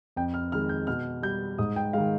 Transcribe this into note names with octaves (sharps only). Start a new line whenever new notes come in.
F2 G5
F6
D#3 G#3 F6
G6
B2 F6
G3 G6
G#2 D#6
G5
D#3 G#3 F5